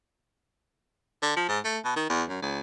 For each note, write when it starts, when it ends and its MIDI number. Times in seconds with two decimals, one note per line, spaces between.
1.22 1.34 50
1.36 1.48 53
1.49 1.59 44
1.64 1.79 57
1.85 1.92 47
1.96 2.07 51
2.10 2.24 40
2.29 2.41 42
2.42 2.60 37